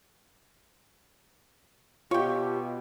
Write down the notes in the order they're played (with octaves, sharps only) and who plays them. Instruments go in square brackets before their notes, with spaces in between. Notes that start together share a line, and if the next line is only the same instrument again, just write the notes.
[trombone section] B2 [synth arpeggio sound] F4 [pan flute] G4 [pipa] C#5 G5